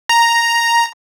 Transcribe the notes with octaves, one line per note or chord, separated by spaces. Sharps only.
A#5